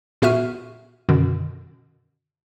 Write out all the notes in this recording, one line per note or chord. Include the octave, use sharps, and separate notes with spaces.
A#2 B3 F#4 E5 F6 D#7
F#2 B2 D3 D#3